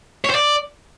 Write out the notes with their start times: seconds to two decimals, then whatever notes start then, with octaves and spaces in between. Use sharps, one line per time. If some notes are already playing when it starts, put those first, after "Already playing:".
0.25 C#5
0.30 C5
0.35 D5